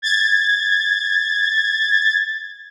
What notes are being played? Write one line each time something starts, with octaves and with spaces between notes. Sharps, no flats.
G#6 A6